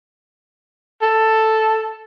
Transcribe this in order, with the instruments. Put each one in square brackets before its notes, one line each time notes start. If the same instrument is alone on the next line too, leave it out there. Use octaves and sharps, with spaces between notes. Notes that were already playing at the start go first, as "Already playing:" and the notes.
[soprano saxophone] A4